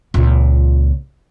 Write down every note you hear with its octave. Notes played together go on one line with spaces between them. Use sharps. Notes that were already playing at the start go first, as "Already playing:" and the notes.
C#2 A#2